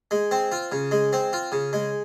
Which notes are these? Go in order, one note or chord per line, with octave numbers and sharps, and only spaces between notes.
G#3
C4
F4
C#3
G#3
C4
F4
C#3
G#3